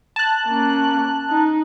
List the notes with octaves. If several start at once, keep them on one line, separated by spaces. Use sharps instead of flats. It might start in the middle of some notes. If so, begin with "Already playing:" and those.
A5 F#6
A#3 C#4
D#4